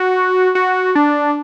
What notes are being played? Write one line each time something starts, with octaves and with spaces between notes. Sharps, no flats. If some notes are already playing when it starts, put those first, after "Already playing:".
Already playing: F#4
F#4
D4